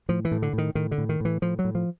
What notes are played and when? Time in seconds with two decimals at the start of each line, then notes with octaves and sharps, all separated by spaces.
0.09 A2 F3
0.25 E3
0.31 A2
0.42 D3
0.53 A2 D#3
0.75 A2 D#3
0.91 D3
0.98 A2
1.09 D#3
1.20 A2 E3
1.42 A2 F3
1.59 F#3
1.65 A2
1.75 F3